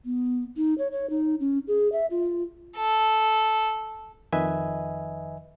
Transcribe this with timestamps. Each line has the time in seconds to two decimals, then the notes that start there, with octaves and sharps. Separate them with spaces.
0.05 B3
0.57 D#4
0.78 C#5
0.92 C#5
1.10 D#4
1.40 C#4
1.68 G#4
1.92 E5
2.11 F4
2.77 A4
4.33 F2 D#3 B4 D#5 E5 G#5